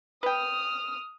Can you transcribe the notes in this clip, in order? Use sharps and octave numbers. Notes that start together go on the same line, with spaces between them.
B4 G5 D#6 F6